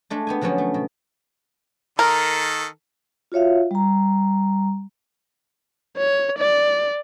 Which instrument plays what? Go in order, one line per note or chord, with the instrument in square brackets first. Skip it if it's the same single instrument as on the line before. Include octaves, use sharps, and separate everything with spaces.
[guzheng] G#3 A3 D4
B3 G4 G#5
D3 F3 F#3 B3 C#4
A3
B2
[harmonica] D#3 A4 [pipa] A#4
[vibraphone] F4 F#4 C#5 E5 F5
G3 A#5
[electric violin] C#5
D5